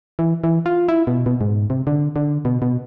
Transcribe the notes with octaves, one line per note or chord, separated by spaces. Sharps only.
E3
E3
F4
E4
B2
B2
G#2
C3
D3
D3
B2
B2